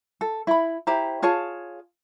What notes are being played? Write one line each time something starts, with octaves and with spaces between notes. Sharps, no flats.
A4
E4 B5
E4 G4 C5 A#5
F4 G#4 C#5 A5